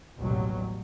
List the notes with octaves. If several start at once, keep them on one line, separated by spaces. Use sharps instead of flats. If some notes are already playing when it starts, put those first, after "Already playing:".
A1 D#2 B2 F#3 G3